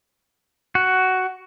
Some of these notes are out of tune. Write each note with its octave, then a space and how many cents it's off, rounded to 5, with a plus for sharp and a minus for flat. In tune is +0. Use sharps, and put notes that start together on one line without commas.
F#4 +10